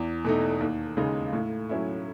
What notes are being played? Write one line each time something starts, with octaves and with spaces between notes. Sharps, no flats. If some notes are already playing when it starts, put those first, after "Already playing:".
Already playing: E2
B2 A3 D#4
D#2
C#3 G#3 D#4
A2
F#3 C#4 E4